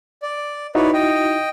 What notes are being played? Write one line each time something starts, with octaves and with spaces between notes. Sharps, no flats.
D5
D#4 E4 F#4 B4 C#5 D5
D#5 G5